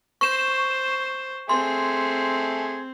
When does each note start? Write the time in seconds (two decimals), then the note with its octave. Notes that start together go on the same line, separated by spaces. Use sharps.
0.21 C5 C#6 E7
1.49 A3 C4 G#4 C6